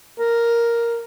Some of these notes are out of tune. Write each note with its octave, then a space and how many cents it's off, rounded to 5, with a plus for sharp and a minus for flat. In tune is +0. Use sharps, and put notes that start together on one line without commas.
A#4 +0